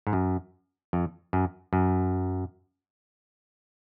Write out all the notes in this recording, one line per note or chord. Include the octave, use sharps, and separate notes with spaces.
G#2
F#2
F2
F#2
F#2